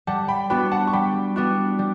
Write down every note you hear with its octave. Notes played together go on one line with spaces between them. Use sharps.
G3 F#5 A5
G5 B5
B3 D4 F#4 G5 B5
F#5 A5
C#6
G3 G5 B5
B3 D4 F#4
G3